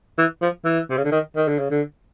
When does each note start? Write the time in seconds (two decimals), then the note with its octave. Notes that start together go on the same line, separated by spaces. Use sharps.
0.18 E3
0.42 F3
0.65 E3
0.90 C3
0.97 C#3
1.04 D3
1.12 D#3
1.36 D#3
1.48 D3
1.59 C#3
1.70 D3